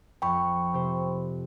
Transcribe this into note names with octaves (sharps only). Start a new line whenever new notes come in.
F2 G5 B5 C#6
C3 G4 C5